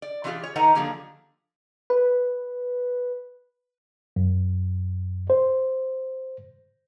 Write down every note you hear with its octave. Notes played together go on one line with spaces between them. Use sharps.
D5
E3 G#3 C4 F4 G4 G#4
C#5
D#3 D#4 A4 B4 F#5 A#5
D3 F3 A#3 G4 G#4
B4
F#2
C5